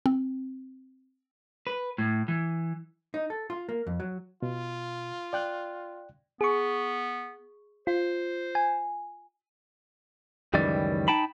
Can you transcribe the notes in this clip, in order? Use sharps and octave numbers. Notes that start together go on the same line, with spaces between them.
C4
B4
A2
E3
D#4
A4
F4
A#3
F2
F#3
B2 F4
D5 G5 F#6
B3 G#4 C#6
F4 C5
G#5
C#2 F#2 D#3 E3 G3 D5
D#4 G5 A5 B5